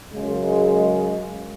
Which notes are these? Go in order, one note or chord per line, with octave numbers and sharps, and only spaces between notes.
F#2 C#3 G#3